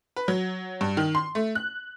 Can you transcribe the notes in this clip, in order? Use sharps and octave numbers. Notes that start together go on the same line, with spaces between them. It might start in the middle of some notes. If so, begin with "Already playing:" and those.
B4
F#3
G2
D#3
C6
A3
F#6